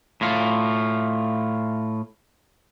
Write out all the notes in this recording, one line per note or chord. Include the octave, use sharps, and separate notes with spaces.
A2 F4